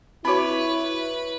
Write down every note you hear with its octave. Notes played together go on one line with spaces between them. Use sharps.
C4 E4 F#4 B4 C#5 B5